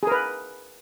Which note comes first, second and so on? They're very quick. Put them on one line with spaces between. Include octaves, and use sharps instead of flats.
G#4 A#4 B4